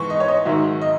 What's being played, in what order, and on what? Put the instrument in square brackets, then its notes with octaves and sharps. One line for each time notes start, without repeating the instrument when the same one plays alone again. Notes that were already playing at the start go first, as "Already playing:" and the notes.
Already playing: [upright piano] G#2 E3 C#6
D#5
C#5
D#5
G#2 D#3 F#3 E5
D#5